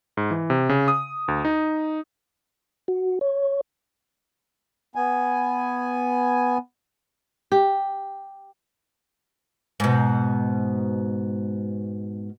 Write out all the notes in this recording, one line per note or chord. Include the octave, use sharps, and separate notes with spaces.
G#2
E3
C3
C#3
D#6
D2
D#4
F#4
C#5
B3 G#5
G4
G#2 B2